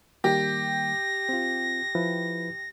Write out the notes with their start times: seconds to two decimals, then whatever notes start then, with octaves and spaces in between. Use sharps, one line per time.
0.24 D#3 G3 A#3 G4 A#6
1.29 C4 F4
1.95 F3 E4 B4